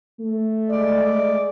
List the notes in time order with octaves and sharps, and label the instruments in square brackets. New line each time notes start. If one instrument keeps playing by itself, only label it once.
[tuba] A3
[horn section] G#3 D5